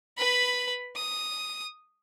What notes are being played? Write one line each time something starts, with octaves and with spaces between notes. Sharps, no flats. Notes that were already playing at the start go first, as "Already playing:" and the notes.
B4 B5
D#6